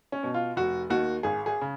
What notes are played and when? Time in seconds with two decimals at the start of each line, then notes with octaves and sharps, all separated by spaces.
0.12 C#4
0.23 B2
0.34 F4
0.56 F1 F#4
0.90 D#2 D#3 F#4
1.23 G#1 G#4
1.46 G#4
1.61 C#3